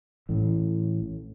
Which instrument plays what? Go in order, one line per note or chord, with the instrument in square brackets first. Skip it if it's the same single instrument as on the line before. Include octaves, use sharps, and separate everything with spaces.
[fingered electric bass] A1 A2